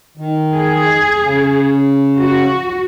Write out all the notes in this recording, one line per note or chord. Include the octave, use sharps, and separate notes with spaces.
D#3
G#4
C#3
F#4